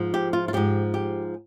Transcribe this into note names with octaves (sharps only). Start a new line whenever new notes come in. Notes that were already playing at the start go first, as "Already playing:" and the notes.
Already playing: G#2 F3
G4
F4
F4
G#2 F3 G4
G4